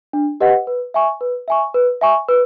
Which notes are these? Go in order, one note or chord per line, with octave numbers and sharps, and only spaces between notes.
D4
G4 B4 D#5 F#5
B4
E5 G#5 C#6
B4
E5 G#5 C#6
B4
E5 G#5 C#6
B4